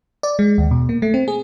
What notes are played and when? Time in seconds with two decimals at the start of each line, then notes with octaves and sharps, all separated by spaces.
0.23 D5
0.39 G#3
0.58 D#2
0.71 B2
0.89 A#3
1.02 A3
1.14 C4
1.28 G#4